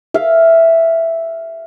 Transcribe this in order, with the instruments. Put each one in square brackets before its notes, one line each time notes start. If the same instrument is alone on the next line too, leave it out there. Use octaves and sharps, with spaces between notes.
[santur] E5 F5